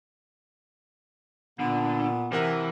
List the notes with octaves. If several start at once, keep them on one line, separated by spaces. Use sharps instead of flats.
A#2 D3 B3
C3 E3 A#4 F#5